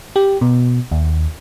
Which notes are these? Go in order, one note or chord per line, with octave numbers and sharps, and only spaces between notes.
G4
B2
D#2